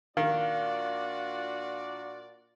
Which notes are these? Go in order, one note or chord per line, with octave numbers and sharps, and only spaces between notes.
A#2 D#3 D4 F4 F#4 D5 F5